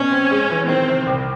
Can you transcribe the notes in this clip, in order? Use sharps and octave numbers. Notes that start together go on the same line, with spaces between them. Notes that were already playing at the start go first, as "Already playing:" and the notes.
Already playing: B2 C#4
C4
G#3
E3
D#3 C4
C3
C2